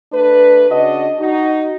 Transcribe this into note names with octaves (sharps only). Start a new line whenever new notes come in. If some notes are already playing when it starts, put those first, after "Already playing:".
A3 D4 B4
C#3 D4 F#4 D#5
D#4 F#4